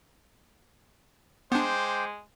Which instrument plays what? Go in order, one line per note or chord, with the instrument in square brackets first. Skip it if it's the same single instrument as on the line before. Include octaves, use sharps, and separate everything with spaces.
[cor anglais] G#3 [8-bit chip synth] B3 D4 [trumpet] C5 [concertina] G5 D6